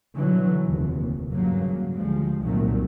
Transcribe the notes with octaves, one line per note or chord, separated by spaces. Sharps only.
B2 D3 E3 F#3
F1 D#2
G2 C#3 F#3 A#3
D2 F3 G3 G#3
C2 F2 A#2 D#3 F#3 A3